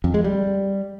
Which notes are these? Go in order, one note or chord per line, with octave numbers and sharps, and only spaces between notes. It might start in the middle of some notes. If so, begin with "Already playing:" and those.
F2
G#3
G3